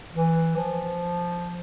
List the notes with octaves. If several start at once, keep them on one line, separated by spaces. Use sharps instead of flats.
E3
F3